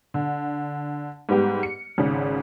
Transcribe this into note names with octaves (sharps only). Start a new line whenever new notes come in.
D3
G#2 G3 B3 G4
C#7
G#1 G#2 C#3